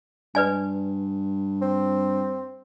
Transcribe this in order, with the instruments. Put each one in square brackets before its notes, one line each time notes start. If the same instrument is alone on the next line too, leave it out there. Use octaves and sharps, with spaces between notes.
[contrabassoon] G2 [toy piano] B4 D5 G#5
[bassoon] C4